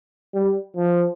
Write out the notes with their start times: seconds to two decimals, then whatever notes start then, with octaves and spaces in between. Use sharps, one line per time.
0.34 G3
0.76 F3